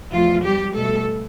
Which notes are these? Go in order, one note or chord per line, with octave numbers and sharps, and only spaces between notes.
E2 B2 F3 A3 F4
G3 G4
B2 G3 A3 A4